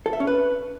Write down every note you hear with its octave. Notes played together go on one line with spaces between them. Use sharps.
A4
E5
C#4
B4